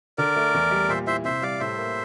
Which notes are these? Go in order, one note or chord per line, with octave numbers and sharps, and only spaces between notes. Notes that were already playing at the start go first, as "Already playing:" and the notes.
D3 A#4 D5
A3
E2
G3
A#2 C5 E5
E4 C5 E5
C3 C5 E5
G3 D5 F5
A2 C5 E5
A#3